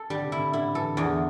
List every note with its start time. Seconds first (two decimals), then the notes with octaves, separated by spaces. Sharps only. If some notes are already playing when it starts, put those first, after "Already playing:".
Already playing: A4
0.10 D3 G3
0.24 C3
0.32 E4
0.39 A2
0.53 D3 E4
0.75 E3 A4
0.97 E2 D3